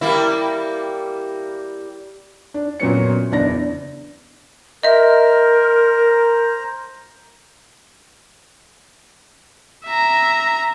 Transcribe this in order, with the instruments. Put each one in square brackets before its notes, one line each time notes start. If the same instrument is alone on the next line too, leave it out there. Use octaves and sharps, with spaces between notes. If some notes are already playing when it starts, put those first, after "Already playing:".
[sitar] G3 A#3 E4
[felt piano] D4
F#2 A#2 F#3 B3 C#4 C#7
F#1 E2 D4 A#6
[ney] A#4 [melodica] C5 A#5 [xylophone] D#5 E5
[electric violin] E5 A#5